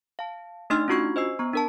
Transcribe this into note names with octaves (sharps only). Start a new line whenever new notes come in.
F5 A5
A3 D4 D#4 D#5 C6 F6
C#4 D4 F4 F#4 C#6 G#6
C5 D#5 G#5 E6 C7
B3 A#5 C#6
D4 A#4 A5